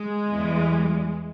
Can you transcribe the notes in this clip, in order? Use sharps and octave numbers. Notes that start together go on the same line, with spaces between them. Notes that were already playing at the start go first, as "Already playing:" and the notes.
Already playing: G#3
E2 E3 G3